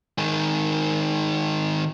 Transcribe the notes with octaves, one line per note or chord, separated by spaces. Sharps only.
G#2 D#3